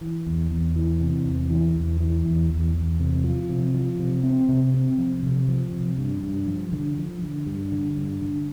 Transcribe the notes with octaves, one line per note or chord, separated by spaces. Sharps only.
E3
E2
E2
E3
C3
E2
E3
E2
E3
E2
E2
E2
C3
F3
C3
F3
C3
C4
C3
C4
F3
C3
F3
C3
G2
G2
F3
D3
F3
D3
G2
D3
G2
D3